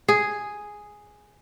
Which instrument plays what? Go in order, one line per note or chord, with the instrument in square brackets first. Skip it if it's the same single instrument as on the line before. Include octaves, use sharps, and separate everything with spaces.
[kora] G#4